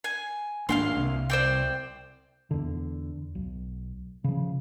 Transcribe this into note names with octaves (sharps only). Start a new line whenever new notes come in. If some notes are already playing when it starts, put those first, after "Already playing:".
G#5
G#1 A#3 D4 F5 G5 C6
C2
C5 D5 G5
E2 D3
B1
C#3 F3